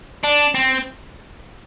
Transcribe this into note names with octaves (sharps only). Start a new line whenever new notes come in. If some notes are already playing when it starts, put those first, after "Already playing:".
D4
C4